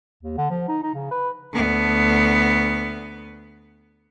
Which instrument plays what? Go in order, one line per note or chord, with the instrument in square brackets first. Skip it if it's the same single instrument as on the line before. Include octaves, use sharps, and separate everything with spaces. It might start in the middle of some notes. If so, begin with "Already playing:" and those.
[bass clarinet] D#2
D3
F3
D#4
D#4
C#3
B4
[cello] D2 B3